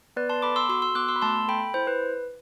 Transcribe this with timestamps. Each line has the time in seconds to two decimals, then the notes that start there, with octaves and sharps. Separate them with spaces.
0.16 B3 B4 D5
0.29 A5 C6
0.42 A4 B5 D6
0.56 C6 E6
0.69 F#4 C6 E6
0.82 C6 E6
0.95 B3 D6 F#6
1.08 C6 E6
1.16 B5
1.22 A3 A5 C6
1.48 A4 G5 B5
1.74 E4 C5
1.87 B4